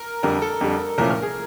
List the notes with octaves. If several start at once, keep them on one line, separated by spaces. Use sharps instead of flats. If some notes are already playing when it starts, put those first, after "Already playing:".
Already playing: A#4
F2 D3 G3 A#4
A4
F2 D3 G3
C2 A#2 F3 A3 C#4 A#4
A#4
G#4